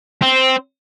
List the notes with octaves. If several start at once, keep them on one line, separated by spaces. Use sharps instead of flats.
C4